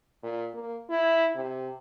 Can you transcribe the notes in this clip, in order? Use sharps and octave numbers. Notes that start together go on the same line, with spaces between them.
A#2
A#3
E4
C3